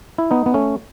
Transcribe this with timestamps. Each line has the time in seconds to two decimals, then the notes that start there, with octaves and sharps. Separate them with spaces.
0.18 E4
0.31 B3 D#4
0.46 B3
0.54 A3 C#4